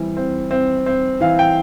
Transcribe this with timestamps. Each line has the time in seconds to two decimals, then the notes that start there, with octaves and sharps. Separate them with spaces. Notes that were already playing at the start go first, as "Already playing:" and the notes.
Already playing: E3 G3 C4
0.17 C4
0.51 C4
0.86 C4
1.21 E3 F5
1.39 G5